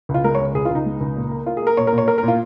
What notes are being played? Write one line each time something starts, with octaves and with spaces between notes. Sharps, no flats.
C#2
F4
G#3 A#4
C#5
C#2
C#2 G#4
F4
C#2 D#4
G#3
C#2
A#2
A#3
A#3 F4
G#4
A#3 A#4
A#2 C#5
A#4
A#2
C#5
A#3 A#4
A#4
A#2 F4